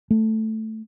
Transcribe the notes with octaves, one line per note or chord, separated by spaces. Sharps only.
A3